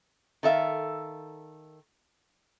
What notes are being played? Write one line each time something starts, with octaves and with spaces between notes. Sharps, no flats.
D#3 A4 E5 F5